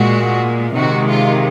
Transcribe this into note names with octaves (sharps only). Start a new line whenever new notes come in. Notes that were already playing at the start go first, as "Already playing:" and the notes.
Already playing: A#2 G#3 F#4
C3 D#3 G#3 F#4
F4